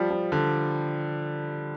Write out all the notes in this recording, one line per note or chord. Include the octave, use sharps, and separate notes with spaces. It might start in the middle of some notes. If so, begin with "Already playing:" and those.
Already playing: F3 G3
F3
D3